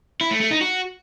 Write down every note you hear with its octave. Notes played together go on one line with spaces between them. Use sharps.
E4
A3
A3
D#4
F#4